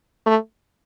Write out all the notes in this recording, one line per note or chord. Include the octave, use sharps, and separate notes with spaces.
A3